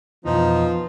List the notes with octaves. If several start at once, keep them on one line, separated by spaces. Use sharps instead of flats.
F2 B2 E3 F3 B3 D#4